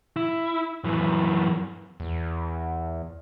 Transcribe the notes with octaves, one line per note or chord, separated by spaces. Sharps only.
E4
F#2 E3
E2